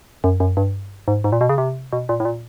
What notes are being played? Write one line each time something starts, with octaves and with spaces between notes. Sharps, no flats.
F#2
F#2
G2
G#2
G#2
A#2
B2
C#3
C3
B2
A#2
A2
A#2